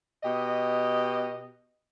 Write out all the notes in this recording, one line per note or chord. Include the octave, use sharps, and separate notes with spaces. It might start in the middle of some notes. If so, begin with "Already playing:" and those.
B2 G4 D#5